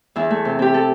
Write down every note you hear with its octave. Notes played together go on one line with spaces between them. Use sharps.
E2 E4
A3
C3
C4 G4
A4